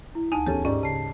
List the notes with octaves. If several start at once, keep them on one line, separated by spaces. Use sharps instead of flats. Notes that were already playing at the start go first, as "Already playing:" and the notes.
E4
D2 D#4 G#5 A5 D#7
E2 C#4 G4 A4
G#2 C#4 G4 D5
C#3 A5 C7